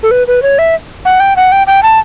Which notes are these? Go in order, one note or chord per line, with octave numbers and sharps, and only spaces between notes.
A4
B4
B4
C#5
E5
F#5
G5
F#5
G5
G5
A5